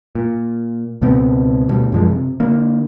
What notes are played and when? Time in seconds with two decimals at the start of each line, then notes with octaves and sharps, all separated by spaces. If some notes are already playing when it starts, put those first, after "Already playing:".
0.15 A#2
1.02 C#2 B2 B3 C4
1.69 D2 B2 G3
1.92 F#2 F3 G#3
2.09 C3
2.40 D3 A#3